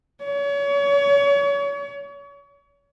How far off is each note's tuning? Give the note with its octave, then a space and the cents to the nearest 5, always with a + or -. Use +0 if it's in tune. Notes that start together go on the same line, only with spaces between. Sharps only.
C#5 +35